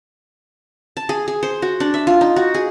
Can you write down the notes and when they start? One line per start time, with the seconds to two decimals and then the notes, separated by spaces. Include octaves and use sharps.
0.97 A5
1.09 G#4
1.28 G#4
1.43 C5
1.62 F#4
1.80 D4
1.94 E5
2.07 F4
2.21 D#4
2.36 F#4
2.54 G#4